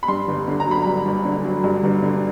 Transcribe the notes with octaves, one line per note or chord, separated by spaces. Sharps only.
B5
G2 C6
G1
D3
A#5
F#3 B5
G2 A#5
G1
D3
F#3
G2
G1
D3